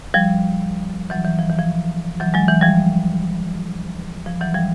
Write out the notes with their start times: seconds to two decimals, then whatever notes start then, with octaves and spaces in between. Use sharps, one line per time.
0.14 F3 G3
1.10 E3 F#3
1.25 E3
1.39 F3
1.49 E3
1.59 F3
2.20 E3 F#3
2.34 F#3 G#3
2.48 E3
2.61 F3 G3
4.26 F3
4.41 E3 F#3
4.55 F3 G3